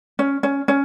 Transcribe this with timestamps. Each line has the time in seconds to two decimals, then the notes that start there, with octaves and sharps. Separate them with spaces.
0.19 C#4
0.43 C#4
0.68 C#4